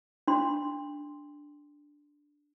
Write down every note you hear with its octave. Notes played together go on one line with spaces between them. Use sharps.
D4 C6